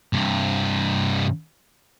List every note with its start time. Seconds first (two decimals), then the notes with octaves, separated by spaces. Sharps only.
0.13 G2 C3